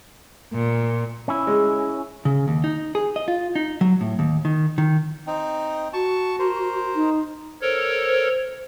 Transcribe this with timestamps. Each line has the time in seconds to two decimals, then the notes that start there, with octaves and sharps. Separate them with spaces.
0.53 A#2
1.28 C#4 E4
1.47 G#3
2.25 C#3
2.48 D#2
2.64 D#4
2.95 G#4
3.16 D#5
3.28 F4
3.56 D#4
3.81 F#3
4.01 A2
4.19 D#2
4.45 D#3
4.78 D#3
5.27 C4 D#4
5.93 F#4 A5 C#6
6.39 A#4 C5
6.94 D#4
7.61 A4 A#4 C5 C#5